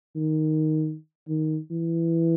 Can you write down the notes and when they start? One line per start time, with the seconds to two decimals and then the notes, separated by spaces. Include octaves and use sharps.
0.16 D#3
1.29 D#3
1.71 E3